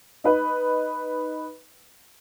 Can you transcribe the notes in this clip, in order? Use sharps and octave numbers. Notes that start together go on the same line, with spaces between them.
D#4 B4